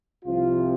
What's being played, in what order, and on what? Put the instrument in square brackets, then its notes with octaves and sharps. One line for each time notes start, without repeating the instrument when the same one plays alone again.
[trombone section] C2 C3 F3 F4